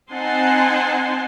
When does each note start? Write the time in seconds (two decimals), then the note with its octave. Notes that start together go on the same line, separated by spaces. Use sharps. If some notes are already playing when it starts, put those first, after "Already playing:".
0.12 C4 D#4 F#5 G#5 A5 C6